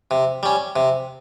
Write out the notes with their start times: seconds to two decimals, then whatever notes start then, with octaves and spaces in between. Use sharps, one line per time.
0.11 C3
0.43 G3 C#4
0.76 C3